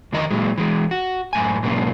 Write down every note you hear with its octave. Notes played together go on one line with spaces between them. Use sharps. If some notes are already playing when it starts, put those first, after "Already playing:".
F2 D#3 D#5 A#5
A#2 F#3 G#3
E3 G#3
F#4
F#2 A2 G#5
G#2 B2 F#3 A#3 C#4